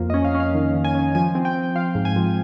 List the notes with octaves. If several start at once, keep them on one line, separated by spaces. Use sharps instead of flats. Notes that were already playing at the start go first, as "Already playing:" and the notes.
Already playing: F2 A#3
D#5
C#4
F5
C#4
F5
D#3
D#3
G#5
C#4
F3 G#5
C4
G5
C4
F3 F5
G#2
G#5
F3